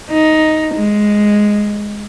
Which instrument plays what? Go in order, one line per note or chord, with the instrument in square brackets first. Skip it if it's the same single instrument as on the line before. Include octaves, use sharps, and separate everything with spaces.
[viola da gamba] D#4
G#3